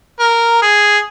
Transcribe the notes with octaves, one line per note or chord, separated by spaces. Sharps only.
A#4
G#4